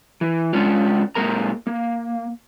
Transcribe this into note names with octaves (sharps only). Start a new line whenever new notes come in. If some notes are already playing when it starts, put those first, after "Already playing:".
E3
G#3 C#4 D4 F4
A#2 G#3 A#3 A#4 A#5
A#3